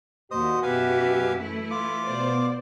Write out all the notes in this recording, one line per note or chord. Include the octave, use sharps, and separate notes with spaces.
D#2 A#2 F#4 C5 D#5 D#6
F#2 B2 G4 B4 E5 F5 G#5
E3 A3 E4
F4 D6
B2 B3 C5 D5